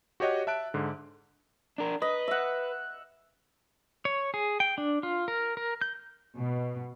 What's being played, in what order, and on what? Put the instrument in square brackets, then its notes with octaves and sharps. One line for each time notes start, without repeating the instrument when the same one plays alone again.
[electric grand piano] F#4 G4 C#5 D#5 F#5
E5 A5 F#6 D7
G#2 D3
[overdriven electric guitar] D4 A#4
[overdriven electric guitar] B4 [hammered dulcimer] D#5
[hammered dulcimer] E5 F#5
[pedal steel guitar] C#5
G#4
G5
D4
F4
A#4
A#4
G6
[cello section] B2